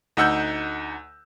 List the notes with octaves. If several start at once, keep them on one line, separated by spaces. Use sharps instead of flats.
D2 D#4 F#5 E6 F#6 G6